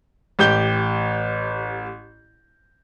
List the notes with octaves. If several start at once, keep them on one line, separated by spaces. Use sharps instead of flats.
A1 G4 G6 G7